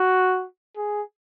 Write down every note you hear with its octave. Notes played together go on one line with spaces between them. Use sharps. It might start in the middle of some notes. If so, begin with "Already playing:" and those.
Already playing: F#4
G#4